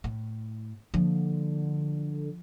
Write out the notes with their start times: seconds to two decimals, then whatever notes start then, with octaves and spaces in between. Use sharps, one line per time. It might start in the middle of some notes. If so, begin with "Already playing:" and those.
0.04 A2
0.94 D3 F3 A#3